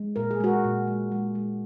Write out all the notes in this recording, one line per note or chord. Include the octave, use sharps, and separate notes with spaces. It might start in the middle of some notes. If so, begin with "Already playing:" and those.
Already playing: G#3
A#2 A#4
G#4
G#3 F#4 A#4
A#2
G#3
G#3
G#3